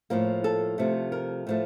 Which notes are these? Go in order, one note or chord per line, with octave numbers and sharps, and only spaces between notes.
A2 F3 A#3
A4
C3 F3 A3
A#4
A2 F3 A3